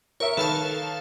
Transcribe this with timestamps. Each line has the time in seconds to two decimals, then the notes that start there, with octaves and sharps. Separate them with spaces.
0.20 A#4 C#5 E5
0.37 D#3 A4 B4 F5 A5